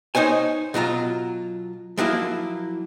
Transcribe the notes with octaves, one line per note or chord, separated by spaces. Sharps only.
D#4 C5 C#5 G#5
B2 F#3 F4 A#5
F3 F#3 A#3 E4